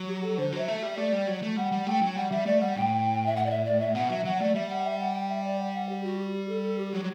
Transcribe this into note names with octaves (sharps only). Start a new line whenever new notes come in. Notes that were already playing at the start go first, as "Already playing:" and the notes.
Already playing: F#3
G4
A4
D3 C5
F#3
E5
A3
E5
G3
A3 D5
G3
F#3
A3
G3 F#5
G3
A3 G5
F#3
G3 F#5
G3 E5
A3 D5
G3 F#5
A2 G5
E5
F#5
D5
E5
D5
E5
B2 F#5
F#3 E5
F#3 F#5
A3 D5
G3 E5
F#5
E5
F#5
G5
E5
D5
F#5
F#5
G4
F#4
G4
G4
A4
A4
G4
F#3 G4